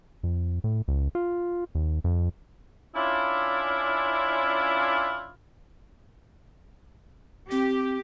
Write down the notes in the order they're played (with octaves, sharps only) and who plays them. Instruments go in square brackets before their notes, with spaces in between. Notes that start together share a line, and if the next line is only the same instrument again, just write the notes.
[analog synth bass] F2
A2
C#2
F4
D#2
F2
[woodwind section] C#4 D4 E4 F4
[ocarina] C4 [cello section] G4